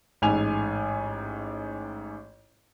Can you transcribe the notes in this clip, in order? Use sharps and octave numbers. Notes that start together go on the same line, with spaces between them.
A1 G#2 G#5 F7